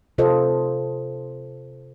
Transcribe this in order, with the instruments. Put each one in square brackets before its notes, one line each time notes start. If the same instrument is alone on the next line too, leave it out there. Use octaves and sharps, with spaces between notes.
[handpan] C3 F4 A4 C5 D#5